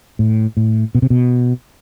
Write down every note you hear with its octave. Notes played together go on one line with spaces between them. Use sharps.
A2
A2
B2
C3
B2